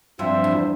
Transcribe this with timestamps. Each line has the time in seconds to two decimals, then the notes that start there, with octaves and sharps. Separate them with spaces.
0.19 G2 F3 C4 F4 C5 E5
0.44 E2